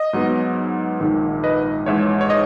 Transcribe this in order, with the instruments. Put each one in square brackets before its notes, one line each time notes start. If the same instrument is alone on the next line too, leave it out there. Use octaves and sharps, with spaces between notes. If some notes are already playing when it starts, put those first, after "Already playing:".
Already playing: [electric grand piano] D#5
G#2 F#3 B3
A#1 G#2 D#3
B4 D#5
A#1 G#2 E3 G#3 C#5 E5
C#5
D#5